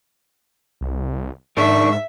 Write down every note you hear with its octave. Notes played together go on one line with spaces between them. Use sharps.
C2
G#2 D4 D#4 A#4 E5 C#6